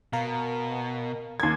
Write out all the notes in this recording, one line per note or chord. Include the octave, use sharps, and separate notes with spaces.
B2 A#4 F5
D#2 A#4 C6 G#6